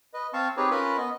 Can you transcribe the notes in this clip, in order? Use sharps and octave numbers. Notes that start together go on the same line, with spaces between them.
B4 D#5
C4 F5 A5 C#6
C4 D#4 G4 G#4 B4 C#5
C#4 F4 A#4 B4 B5
B3 D#5